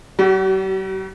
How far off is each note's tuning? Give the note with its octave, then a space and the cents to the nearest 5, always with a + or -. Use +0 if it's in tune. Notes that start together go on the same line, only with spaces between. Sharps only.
G3 -45 F#4 +35